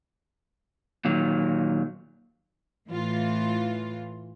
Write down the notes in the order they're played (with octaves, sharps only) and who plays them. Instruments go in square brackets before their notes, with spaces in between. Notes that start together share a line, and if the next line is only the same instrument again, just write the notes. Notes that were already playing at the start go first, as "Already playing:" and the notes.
[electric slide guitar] A#2 D#3 F#3
[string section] A2 E3 F4